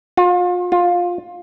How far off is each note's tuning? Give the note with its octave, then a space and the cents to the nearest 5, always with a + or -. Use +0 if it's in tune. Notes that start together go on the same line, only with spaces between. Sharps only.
F4 +35
F4 +15